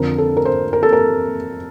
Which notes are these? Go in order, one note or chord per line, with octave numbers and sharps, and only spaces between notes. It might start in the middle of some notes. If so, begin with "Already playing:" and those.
Already playing: F2 D3 A#4
A4
A#4
C5
A#4
A4
A#4